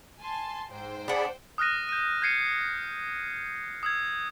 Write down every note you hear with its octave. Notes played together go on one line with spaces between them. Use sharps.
G#5 A5 C6
G#2 C5 G5
D4 G#4 D5 F#5 B5
D#6 F6 F#6 A#6 D#7
G6 D#7
G6 G#6 C7 C#7 D#7
D#6 E6 G#6